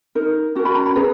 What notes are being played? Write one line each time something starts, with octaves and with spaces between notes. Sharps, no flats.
D#4 A#4
C#4 F#4 A#4
B5
A#5
B5
C#4 G#4 B4 A#5